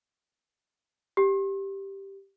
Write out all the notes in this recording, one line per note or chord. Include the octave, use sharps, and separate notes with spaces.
G4